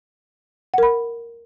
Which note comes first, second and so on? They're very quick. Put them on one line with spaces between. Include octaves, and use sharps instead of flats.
F#5 A#4 B5